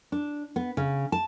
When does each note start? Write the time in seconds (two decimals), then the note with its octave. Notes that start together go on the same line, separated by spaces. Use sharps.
0.12 D4
0.56 B3
0.77 C#3
1.12 A5